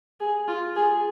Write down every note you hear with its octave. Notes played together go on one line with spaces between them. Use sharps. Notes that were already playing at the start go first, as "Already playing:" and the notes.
G#4
F4
G#4